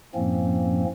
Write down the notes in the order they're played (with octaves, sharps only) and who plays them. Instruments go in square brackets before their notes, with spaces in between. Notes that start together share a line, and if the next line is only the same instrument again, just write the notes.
[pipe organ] F#2 A2 F3 A#3 C4 C#4